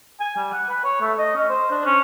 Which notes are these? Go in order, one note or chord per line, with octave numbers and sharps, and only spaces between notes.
G#5
G3
F#5
B4
C#5
A3
D#5
C#4
C5
D4
C#4